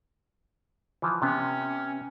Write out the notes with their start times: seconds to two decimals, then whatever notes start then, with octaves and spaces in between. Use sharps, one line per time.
1.02 E3 F3
1.22 C3 B3 C#4